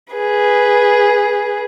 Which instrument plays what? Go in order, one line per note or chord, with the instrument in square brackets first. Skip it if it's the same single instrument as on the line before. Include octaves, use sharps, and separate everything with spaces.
[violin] G#4 B4